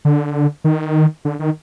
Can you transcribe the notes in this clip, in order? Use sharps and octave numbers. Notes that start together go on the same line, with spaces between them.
D3
D#3
D3
D#3